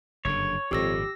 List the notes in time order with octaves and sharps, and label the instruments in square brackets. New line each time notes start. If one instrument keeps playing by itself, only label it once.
[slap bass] F#1 G2 D3 [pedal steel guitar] C#5
[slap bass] G#1 A#2 [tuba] F2 [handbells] G4 E6 A#6